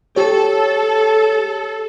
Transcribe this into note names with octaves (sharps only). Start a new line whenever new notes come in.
G4 A4 C#5